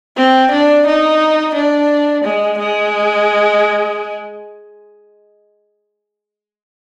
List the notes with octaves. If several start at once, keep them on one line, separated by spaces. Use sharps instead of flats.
C4
D4
D#4
D4
G#3
G#3